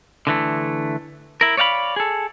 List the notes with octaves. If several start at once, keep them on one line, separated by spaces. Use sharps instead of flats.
D3 E3 A3
E4 A#4
C#5 D5 F5 F#5 B5
G#4 A4